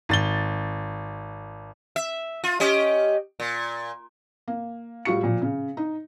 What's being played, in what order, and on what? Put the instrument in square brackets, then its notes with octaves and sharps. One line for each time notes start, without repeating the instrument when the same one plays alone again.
[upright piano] G#1 A6 G7
[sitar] E5
F4
C#4 G4 D#5
A#2
[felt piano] A#3
A2 G3 F4 F#4 C#6 C#7
A#2 F3
C#3
D#4